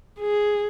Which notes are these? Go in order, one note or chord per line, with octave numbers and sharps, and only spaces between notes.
G#4